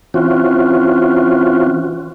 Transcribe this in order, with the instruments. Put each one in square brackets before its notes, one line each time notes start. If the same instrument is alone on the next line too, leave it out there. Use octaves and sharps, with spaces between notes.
[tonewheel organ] E3 C4 C#4 F4 F#4